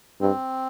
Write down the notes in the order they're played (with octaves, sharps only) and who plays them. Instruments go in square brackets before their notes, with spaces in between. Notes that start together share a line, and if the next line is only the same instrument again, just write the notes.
[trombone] G2 [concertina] C4